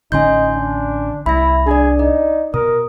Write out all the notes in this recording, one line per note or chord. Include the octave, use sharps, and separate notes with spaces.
A1 D3 C#4 D#4 G#5 C6 G6
D4
C2 E4 B5 A#6
D4 G#4 D5
D#4 D5
B2 A#4 D#6